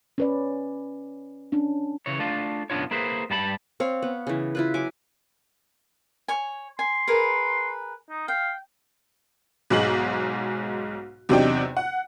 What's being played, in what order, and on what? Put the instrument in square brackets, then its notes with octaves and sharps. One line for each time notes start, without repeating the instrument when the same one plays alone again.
[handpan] C#4 B4 D5
C#4 D4
[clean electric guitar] C#3 E3 C#5
A3 D4 F4
B1 F#2 B3 D4 F4 C#5
A#3 E4 G#4 B4 C5
G2 G3 A5 B5
[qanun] C4 C#5 F5
B3
C#3 E3
E4 F4 B4
F#3 G#5 D6
[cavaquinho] C#5 G#5
[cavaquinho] G#5 [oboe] C6
[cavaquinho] G#4 A#4 B4
[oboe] D#4
[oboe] F5 [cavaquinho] G5
[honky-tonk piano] B1 G#2 G#3 F#7
E2 C3 F#3 D4 D#4 G5
F#5